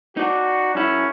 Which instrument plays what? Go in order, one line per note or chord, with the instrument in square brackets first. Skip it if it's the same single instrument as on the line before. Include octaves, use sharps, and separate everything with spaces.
[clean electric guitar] D#4 D5 [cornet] F#4
[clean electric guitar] F#2 E4 [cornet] C#4